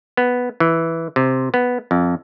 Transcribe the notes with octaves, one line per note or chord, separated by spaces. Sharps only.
B3
E3
C3
B3
F2